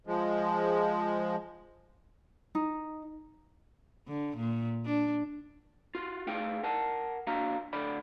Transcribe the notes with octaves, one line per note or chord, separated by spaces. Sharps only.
F3 G#3
D#4
D3
A#2
D4
F4 F#4
A3 D#4 G#4 F5 G5
A#4 F#5 A5
A#3 D4 F#4 F5 A#5
D2 D3 D5 B5